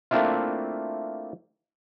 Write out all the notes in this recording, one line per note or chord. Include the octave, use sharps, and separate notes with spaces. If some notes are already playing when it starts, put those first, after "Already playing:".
A3 A#3 C4 D4 E4 F4